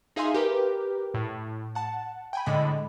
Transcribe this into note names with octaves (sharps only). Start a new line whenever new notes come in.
D#4 G#4 E5 F5 G#5 C6
G4 A#4 B4
A2
F#5 A5
G5 G#5 B5
A2 D3 G#3 D#5 B5